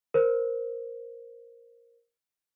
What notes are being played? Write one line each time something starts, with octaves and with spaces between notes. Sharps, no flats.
A#4 C5